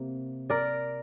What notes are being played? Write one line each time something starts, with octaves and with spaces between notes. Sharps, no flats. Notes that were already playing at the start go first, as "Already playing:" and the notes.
Already playing: C3 A#3
A#4 D5